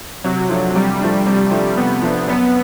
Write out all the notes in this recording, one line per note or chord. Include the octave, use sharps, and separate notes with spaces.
C3 F#3
F3 A3 D4
C3 G3
F3 A3 D4
C3 G3
F3 A3 D4
C3 B3
F3 A3 D4
F#2 B3